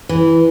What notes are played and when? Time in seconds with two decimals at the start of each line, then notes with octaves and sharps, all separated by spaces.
0.09 E3